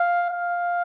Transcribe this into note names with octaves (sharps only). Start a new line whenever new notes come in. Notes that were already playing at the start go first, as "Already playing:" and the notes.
Already playing: F5
F5